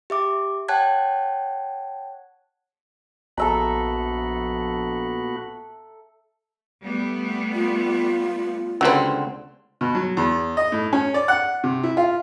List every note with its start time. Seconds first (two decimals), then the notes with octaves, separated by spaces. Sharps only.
0.10 G4 E5 D6
0.68 C#5 F#5 G5 A5 F#6 G#6
3.38 A#1 B3 F#4 A4 E5 A#5
6.83 G3 A3 B3
7.54 F4
8.81 C#2 D3 F#3 B3 C4
9.81 B2
9.95 F#3
10.17 E2
10.57 D#5
10.72 A2
10.93 C#4
11.14 D5
11.28 F#5
11.64 C3
11.83 E4
11.97 F4